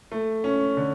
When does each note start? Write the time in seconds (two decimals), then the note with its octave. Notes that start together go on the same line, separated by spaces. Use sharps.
0.12 A3
0.44 C#4
0.77 D3